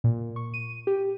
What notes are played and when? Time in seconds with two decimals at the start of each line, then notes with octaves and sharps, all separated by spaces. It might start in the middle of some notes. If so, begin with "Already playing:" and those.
0.04 A#2
0.36 C#6
0.54 D#7
0.87 G4